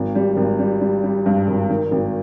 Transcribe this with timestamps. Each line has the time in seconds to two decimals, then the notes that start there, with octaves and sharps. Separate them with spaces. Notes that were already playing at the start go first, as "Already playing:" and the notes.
Already playing: G#1
0.15 G3
0.37 G#1
0.59 G3
0.81 G3
1.04 G3
1.26 G2
1.48 G#1
1.69 D#3
1.91 G#1